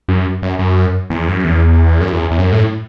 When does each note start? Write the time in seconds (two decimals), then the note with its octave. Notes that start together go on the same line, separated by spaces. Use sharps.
0.08 F#2
0.42 F#2
0.59 F#2
1.10 E2
1.28 F#2
1.44 E2
2.01 F#2
2.13 E2
2.31 E2
2.38 F#2
2.52 A2